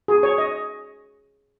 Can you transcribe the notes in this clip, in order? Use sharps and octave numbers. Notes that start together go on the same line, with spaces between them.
G#4
C#5
D#5